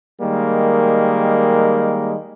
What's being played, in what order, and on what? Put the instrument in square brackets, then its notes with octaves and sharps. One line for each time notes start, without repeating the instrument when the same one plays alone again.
[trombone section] D#3 G3 G#3 A#3